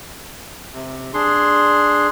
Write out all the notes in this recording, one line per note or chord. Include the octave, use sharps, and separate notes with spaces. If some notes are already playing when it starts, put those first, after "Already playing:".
C3
D4 G#4 C6